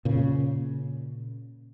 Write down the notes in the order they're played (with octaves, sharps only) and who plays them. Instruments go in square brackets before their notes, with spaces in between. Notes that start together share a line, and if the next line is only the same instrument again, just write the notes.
[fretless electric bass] A#2 C#3